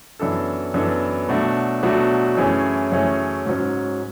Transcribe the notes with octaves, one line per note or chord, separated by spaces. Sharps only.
F#2 E3 B3 D4 A4
F#2 E3 B3 D4 A4
B2 F#3 A3 D4 F#4
B2 F#3 A3 D4 F#4
F#2 E3 A3 C#4 G#4
F#2 E3 A3 C#4 G#4
G#2 F#3 C#4